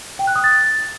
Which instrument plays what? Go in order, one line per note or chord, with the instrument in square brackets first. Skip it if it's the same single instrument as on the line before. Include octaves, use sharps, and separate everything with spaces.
[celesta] G5
F#6
D#6
A6